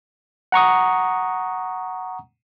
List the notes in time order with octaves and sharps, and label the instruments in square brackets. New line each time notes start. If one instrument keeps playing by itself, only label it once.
[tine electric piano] F#5 A#5 C#6 D#6